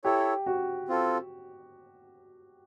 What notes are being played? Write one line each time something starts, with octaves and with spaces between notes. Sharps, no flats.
E4 G4 A4 C#5
F#4
C4 F4 A4